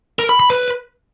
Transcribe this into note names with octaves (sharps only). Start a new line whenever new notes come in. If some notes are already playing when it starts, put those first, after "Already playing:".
A#4
B5
B5
B4